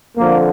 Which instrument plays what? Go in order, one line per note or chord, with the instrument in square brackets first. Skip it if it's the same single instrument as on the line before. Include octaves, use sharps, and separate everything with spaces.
[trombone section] F2 D3 F3 A#3